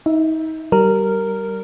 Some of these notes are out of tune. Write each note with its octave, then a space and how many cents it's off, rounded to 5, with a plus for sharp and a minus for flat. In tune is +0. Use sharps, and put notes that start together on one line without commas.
D#4 +30 E5 +0
G3 -25 A#4 -10